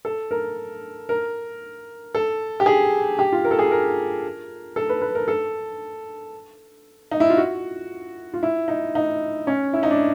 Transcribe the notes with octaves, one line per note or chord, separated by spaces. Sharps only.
A4
A#4
A#4
A4
G4
G#4
G4
F4
A#4
A4
G#4
A#4
A4
B4
B4
A#4
A4
D#4
E4
F4
F#4
F4
E4
D#4
D#4
C#4
E4
D#4
D4